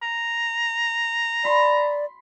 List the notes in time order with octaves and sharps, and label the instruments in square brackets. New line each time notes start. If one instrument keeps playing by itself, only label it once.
[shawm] A#5
[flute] D5 [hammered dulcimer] B5 C6